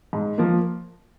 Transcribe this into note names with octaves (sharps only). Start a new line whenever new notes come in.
G#2
F3 A#3